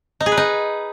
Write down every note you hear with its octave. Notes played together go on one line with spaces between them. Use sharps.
D#4
G#4
B4
D#4